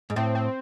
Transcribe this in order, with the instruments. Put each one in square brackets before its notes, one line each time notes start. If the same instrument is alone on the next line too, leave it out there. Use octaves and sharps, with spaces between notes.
[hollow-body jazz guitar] G#2
[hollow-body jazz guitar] A2 [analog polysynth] C4
[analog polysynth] C4